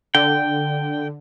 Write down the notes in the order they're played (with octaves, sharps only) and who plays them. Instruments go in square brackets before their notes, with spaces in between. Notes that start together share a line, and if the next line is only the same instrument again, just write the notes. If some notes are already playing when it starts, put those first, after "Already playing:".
[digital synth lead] D3 [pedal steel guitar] G5